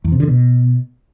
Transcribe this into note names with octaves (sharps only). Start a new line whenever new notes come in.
E2
C3
D3
B2